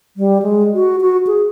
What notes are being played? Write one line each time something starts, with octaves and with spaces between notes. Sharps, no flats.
G3
G#3
F#4
F#4
G#4